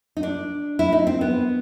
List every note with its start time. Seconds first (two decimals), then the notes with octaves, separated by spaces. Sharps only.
0.17 D#4
0.23 D4
0.79 E4
0.92 D#4
1.07 C4
1.21 B3